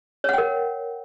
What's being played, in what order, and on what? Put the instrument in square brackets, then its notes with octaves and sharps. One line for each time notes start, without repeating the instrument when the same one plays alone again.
[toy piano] C#5
F#5
G5
A#4